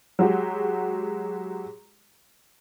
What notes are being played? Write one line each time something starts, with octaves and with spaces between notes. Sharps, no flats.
F#3 G#3 F#4 G4